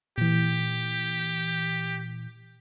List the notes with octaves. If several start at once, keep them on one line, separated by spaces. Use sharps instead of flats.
A#2 E3 G4